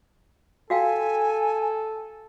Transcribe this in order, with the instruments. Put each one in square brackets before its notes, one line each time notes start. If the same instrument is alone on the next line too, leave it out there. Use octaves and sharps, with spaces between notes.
[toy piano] F#4 F5 G5 [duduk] A4 [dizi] G#5